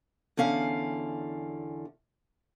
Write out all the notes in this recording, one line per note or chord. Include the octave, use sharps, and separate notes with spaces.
E2 D3 C#4 F5